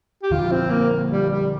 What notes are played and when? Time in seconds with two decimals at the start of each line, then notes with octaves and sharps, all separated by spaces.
0.23 G4
0.31 D3 F3 F4
0.51 C4
0.71 A#3
1.10 G3
1.30 G3